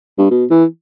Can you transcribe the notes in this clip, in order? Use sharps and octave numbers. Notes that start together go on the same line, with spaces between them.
G2
B2
E3